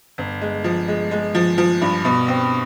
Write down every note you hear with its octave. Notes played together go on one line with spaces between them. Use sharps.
G1
G#3
F3
G#3
G#3
F3
F3
G2
B2
C4